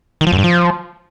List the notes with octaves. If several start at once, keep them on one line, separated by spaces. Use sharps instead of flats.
D#3
F3
F#2
G2
F3